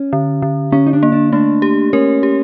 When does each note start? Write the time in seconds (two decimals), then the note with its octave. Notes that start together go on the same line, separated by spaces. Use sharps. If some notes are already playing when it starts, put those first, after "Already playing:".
Already playing: C#4
0.13 D3
0.42 D3
0.72 D3 C#4
0.86 D#4
0.93 D4
1.03 A#3
1.12 D4
1.32 A3 D4
1.62 G4
1.93 C#4 A#4
2.23 G4